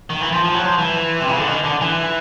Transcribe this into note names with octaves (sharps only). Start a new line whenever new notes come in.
D#3
E3
F3
F3
F#3
F3
E3
C3
C#3
D3
D#3
D3
E3